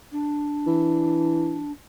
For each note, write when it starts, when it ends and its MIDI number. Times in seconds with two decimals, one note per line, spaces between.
0.12 1.72 62
0.67 1.61 52